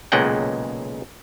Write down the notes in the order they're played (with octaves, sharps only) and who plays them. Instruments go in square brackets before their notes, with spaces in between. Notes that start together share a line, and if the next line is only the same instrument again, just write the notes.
[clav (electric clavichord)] B1 A#2 C#3 G#3 F#5 G5